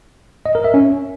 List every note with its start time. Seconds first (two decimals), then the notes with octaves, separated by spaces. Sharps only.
0.46 D#5
0.55 A#4
0.64 E5
0.74 C#4